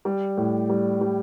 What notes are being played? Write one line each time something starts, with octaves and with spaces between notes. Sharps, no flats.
G3
A2
G3
G3